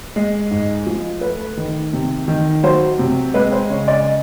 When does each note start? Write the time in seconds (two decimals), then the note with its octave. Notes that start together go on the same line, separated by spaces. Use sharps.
0.16 G#3
0.51 G#2
0.87 F3
1.21 A3 B4
1.57 D#3
1.93 C3
2.28 D#3
2.63 F#3 C5
2.99 C3
3.34 G#3 B4
3.52 C5
3.69 C#3 C#5
3.88 D5
4.05 D#5